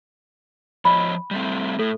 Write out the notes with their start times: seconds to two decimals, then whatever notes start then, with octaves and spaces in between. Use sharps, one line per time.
0.85 F3 C#5 D#5 B5
1.31 G3 A3 C4
1.79 A2 A4